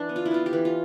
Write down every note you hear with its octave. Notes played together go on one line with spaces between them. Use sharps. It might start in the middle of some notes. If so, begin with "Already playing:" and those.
Already playing: E3 D4
B3
F4
E4
B3 F4
G4
E3
F4